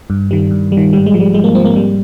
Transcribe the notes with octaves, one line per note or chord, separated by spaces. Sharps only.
G2
D#3 G3
G2
G3
D#3
G#2 G3
G#3
F3
G3
G#2 G#3
A#3
F3 C4
A#3
G#2 G3